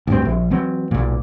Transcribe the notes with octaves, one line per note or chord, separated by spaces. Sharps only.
D2 G2 C4
A#1
E3 F#3 C4
B1 A#2